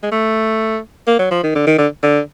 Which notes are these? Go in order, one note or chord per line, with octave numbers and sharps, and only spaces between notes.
G#3
A3
A#3
F#3
F3
D#3
D3
D#3
D3
D3